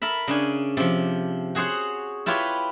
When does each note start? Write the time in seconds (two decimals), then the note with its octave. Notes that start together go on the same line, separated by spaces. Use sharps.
0.02 A4 A#4 E5 B5
0.28 C#3 D4 G#5
0.77 C3 F3
1.55 F#4 G#4 C5 C#5 F#5
2.26 E4 F4 G4 B4 C#5